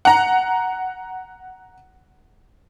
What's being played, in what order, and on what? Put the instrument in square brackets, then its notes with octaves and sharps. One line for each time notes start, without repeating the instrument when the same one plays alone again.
[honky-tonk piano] F#5 A#5